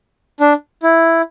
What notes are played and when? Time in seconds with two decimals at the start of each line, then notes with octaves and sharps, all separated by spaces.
0.40 D4
0.83 E4